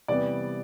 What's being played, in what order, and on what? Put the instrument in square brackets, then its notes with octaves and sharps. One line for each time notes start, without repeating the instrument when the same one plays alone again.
[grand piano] C3 E3 G3 B3 D5